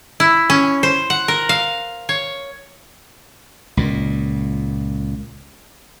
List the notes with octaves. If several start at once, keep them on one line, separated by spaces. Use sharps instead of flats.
E4
C#4
C5
F#5
A#4
F5
C#5
C#2 A#2